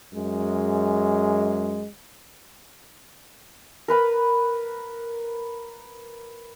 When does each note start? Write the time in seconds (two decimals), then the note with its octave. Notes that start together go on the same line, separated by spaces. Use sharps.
0.13 F#2 G#3
3.88 A#4 B4 B5